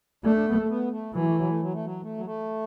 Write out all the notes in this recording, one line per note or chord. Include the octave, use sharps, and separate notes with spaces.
A3 D4
D4
B3
A3
B3
A3
E3 F#3
A3
F#3
A3
F#3
A3
F#3
A3
F#3
A3